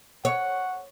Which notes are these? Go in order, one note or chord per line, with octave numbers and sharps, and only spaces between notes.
C#5 F#5